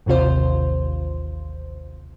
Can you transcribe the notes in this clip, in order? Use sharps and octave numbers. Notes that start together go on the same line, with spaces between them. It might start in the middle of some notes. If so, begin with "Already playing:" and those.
A1 D#2 C3 F4 C5